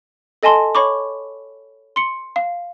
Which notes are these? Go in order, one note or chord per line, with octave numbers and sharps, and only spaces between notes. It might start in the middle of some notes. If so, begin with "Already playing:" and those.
A4 D#5 G#5 A5 C6
C#5 B5 C#6 D6
C6 C#7
F5